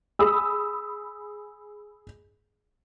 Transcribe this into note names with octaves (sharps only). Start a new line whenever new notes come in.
G#4 B5 D#6 E6